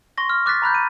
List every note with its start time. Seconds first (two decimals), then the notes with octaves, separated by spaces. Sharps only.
0.18 C6 C#6 A#6
0.30 F6
0.46 D6 F#6 A6 B6
0.62 A#5 B5 F#6 G6
0.75 D#7